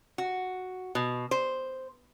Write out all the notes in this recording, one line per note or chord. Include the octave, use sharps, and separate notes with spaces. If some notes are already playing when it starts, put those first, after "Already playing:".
F#4
B2
C5